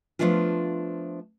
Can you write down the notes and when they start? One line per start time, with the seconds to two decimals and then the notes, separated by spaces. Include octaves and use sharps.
0.19 F3 G3 A3 B3 D4 F4